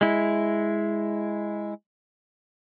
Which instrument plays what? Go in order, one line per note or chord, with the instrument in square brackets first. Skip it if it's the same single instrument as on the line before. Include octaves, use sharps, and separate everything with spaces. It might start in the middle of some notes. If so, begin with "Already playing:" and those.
[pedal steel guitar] G#3 E4